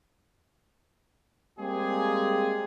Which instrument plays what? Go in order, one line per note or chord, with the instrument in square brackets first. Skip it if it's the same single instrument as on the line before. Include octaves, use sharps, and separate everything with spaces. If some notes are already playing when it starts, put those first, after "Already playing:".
[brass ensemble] G3 G#3 A#3 C4 G4 G#4